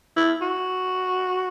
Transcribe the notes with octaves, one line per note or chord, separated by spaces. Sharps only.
E4
F#4